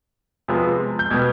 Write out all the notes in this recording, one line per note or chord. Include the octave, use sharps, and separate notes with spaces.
C3 F3 G#3 B3
G6
B2 G3 B3 G#6